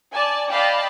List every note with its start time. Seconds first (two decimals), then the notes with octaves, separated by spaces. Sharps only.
0.13 D5 G#5 A5
0.51 D5 D#5 F5 G5 A5 B5